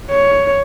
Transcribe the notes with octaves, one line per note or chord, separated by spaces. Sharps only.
C#5